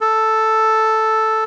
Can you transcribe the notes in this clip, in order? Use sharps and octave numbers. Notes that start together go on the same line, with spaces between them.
A4